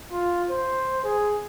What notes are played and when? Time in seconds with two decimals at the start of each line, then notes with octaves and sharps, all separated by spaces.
0.12 F4
0.50 C5
1.04 G#4